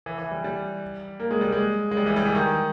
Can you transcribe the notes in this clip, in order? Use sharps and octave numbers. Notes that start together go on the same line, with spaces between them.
E3
E3
G3
G3
A#3
G#3
G3
G#3
G#3
G3
E3
G3
E3
D#3